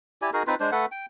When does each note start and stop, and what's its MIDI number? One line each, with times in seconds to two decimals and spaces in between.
0.22 0.30 64
0.22 0.30 67
0.22 0.30 74
0.22 0.30 80
0.33 0.43 63
0.33 0.43 66
0.33 0.43 68
0.33 0.43 70
0.47 0.55 60
0.47 0.55 63
0.47 0.55 65
0.47 0.55 71
0.60 0.71 56
0.60 0.71 62
0.60 0.71 72
0.72 0.86 57
0.72 0.86 69
0.72 0.86 71
0.72 0.86 78
0.92 1.06 79